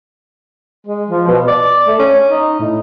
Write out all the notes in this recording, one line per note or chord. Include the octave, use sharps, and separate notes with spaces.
G#3
F3
B2
D5
A3
C#4
D#4
A2